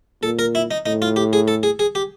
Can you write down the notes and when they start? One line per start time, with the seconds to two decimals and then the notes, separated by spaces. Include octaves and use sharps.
0.23 A#2 A4
0.39 A#4
0.55 E4
0.71 D#4
0.86 A2 D#4
1.02 F4
1.16 G4
1.33 G#4
1.48 A4
1.63 G#4
1.79 G#4
1.95 G4